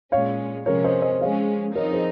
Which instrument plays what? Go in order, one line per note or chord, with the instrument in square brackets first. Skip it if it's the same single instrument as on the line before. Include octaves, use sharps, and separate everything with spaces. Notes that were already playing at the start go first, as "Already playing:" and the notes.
[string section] A#2 G#3 C#4 [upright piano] C#5 F5
[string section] C3 F3 G#3 C#4 [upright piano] A#4 C#5
[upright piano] C5 D#5
C5 D#5
[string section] F3 G#3 C#4 [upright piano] C#5 F5
[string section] F3 C4 D#4 [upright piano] A#4 C#5
[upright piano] G#4 C5